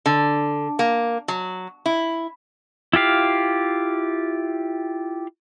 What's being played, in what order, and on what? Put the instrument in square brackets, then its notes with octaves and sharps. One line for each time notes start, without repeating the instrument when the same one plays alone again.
[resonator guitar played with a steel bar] D3
A#3
F#3
E4
[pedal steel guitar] E4 F4 G4 F5